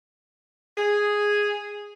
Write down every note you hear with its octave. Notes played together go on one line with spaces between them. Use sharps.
G#4